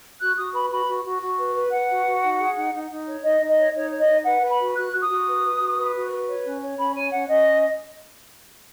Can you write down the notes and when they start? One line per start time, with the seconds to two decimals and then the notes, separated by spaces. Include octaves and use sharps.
0.20 F#4 F#6
0.37 F#4 D#6
0.53 B4 B5
0.70 F#4 B5
0.87 F#4
1.05 F#4
1.22 F#4
1.38 B4
1.55 B4
1.72 B4 F#5
1.89 F#4
2.06 F#4
2.22 D#4
2.40 G#4
2.56 D#4
2.74 D#4
2.91 D#4
3.07 C#5
3.24 D#4 D#5
3.41 D#4
3.50 D#5
3.58 C#5
3.75 D#4 C#5
3.92 C#5
3.99 D#5
4.09 D#4
4.25 B4 F#5
4.42 B4
4.51 B5
4.59 F#4
4.76 F#4 F#6
4.93 F#4
5.02 D#6
5.09 F#4
5.27 B4
5.43 B4
5.60 F#4
5.77 B4
5.94 F#4
6.12 B4
6.29 C#5
6.45 C#4
6.62 C#5
6.78 C#4 B5
6.95 C#5 G#5
7.13 C#4 F#5
7.29 C#4 D#5